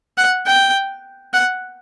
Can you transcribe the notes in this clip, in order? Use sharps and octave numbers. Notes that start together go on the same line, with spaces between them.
F#5
G5
F#5